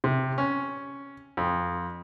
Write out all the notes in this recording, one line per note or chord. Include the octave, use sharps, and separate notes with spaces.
C3
C#4
F2